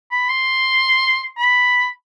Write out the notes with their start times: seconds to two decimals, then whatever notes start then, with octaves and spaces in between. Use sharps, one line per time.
0.11 B5
0.29 C6
1.38 B5